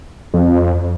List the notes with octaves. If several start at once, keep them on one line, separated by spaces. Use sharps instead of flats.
F2